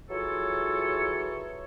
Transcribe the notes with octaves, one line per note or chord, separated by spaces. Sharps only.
E3 F#3 F4 G#4 A4 C#5